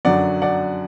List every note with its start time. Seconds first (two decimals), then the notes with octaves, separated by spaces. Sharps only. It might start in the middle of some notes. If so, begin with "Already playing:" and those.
0.05 F#2 D3 F#3 D5 F#5
0.42 D5 F#5